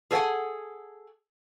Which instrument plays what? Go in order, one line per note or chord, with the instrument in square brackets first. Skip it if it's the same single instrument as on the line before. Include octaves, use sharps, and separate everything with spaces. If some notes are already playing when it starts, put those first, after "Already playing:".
[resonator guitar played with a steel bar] G#4 A4 C#5 F5 F#5 G#5